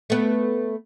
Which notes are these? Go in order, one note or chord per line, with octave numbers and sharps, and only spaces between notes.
A3 B3